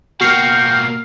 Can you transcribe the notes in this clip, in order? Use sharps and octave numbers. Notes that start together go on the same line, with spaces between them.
B2 A#3 F#4 G5 F6 C7